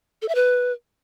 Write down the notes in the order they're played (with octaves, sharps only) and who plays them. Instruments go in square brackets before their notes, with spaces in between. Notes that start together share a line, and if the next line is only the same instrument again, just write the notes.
[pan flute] A4
E5
B4